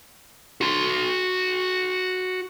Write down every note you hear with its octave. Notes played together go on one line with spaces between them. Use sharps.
F#4 C6